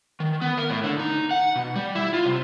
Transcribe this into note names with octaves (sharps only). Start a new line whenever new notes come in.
D#3
B3
A#4
A2
D3
D#4
F#5
B2
G3
E4
F4
C3